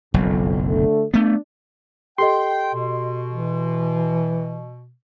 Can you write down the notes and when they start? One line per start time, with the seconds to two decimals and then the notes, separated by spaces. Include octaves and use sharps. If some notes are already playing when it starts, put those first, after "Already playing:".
0.14 F#1 B1 F2
0.69 D3 A3
1.14 A3 B3 D4
2.18 G4 A4 D#5 G5 C6
2.74 B2
3.30 E3